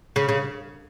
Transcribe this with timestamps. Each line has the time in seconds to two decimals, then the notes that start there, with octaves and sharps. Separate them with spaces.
0.16 C#3
0.28 C#3